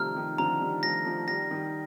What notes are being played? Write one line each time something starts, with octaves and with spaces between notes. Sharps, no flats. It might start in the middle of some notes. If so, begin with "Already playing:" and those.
Already playing: C3 D#3 F3 G3 A3 A#5 F6
C3 D#3
D3 F3 A#5
D#3 G3
F3 A3 A#6
F3 A3
D#3 G3 A#6
D#3 G3